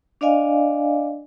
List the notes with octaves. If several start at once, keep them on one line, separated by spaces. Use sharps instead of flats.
D4 D5 D#5 F5 G#5